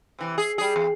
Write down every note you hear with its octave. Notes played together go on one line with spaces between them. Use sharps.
C3 E3
G#4
G3 G#4
E2